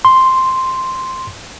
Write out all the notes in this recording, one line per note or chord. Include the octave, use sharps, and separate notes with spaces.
C6